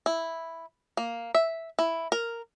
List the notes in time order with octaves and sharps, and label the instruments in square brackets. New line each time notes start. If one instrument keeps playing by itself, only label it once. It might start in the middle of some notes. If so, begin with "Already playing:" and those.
[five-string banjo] E4
A#3
E5
E4
A#4